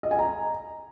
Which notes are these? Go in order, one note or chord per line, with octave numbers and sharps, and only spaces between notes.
D#5
G#5
A#5